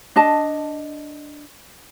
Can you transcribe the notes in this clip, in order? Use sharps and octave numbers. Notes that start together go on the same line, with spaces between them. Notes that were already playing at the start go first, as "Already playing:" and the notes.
D4 D#5 A5